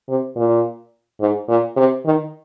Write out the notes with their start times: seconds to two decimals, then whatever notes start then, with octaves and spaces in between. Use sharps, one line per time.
0.09 C3
0.36 A#2
1.21 G#2
1.48 A#2
1.76 C3
2.05 D#3